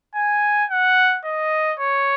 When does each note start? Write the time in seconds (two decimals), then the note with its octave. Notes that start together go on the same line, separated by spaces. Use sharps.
0.15 G#5
0.70 F#5
1.25 D#5
1.79 C#5